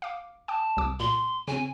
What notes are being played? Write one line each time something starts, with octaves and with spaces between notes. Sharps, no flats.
F5 D6
G5 A5 D6
C2 D6
A#2 C6
C#3 C4 G#5